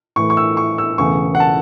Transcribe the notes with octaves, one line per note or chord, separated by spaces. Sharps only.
A2 E3 A3 C#6
C#6
E6
C#6
E6
E1 E2 C#3 A3 C#6
F#5
A5